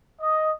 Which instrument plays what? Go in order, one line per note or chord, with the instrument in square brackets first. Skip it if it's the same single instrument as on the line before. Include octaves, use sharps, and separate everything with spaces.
[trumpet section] D#5